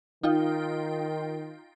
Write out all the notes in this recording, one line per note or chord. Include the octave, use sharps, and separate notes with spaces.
D#3 D#4 F4 G5